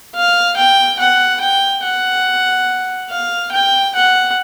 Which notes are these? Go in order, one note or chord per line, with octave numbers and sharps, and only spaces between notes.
F5
G5
F#5
G5
F#5
F5
G5
F#5